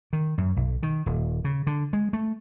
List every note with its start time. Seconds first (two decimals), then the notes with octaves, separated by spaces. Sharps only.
0.13 D#3
0.38 F#2
0.56 B1
0.83 D#3
1.06 D#1
1.44 C#3
1.67 D3
1.93 G#3
2.13 A3